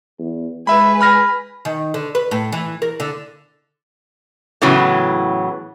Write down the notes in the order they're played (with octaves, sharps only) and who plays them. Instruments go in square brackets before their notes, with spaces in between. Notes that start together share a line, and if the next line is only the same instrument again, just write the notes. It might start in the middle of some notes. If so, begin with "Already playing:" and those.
[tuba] E2
[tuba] G#3 [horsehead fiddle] B4 G#5 [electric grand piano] E5 B5
[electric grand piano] B5 F6 A#6
[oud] D#3
D3
B4
A2
E3
A#4
D3
[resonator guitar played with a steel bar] A2 C#3 E3 F#3 B3